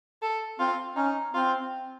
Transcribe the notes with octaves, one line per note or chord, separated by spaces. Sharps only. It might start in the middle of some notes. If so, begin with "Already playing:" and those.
A4
C4 F4
C#4 D#4
C4 F4